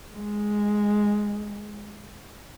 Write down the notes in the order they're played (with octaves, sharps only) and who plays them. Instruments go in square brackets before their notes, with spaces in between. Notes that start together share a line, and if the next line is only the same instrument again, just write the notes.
[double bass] G#3